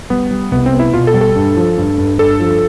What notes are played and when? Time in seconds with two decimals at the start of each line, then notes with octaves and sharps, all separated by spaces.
0.10 G3 B3
0.31 G3
0.52 C2 B3
0.66 C4
0.73 B3
0.79 E4
0.94 B2 F4
1.07 A4
1.14 G3
1.21 A4
1.36 G2
1.56 F3
1.78 G2
1.98 G2
2.18 G2 A4
2.40 F3